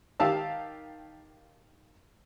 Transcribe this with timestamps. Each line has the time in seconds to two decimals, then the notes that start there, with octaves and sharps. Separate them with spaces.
0.20 D#3 G4 F5 A5 E6